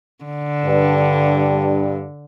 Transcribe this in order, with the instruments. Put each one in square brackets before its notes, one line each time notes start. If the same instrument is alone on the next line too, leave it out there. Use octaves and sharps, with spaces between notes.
[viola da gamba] D3
[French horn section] G2